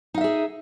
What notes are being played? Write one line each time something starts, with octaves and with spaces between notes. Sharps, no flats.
D#4 G#4 E5 F5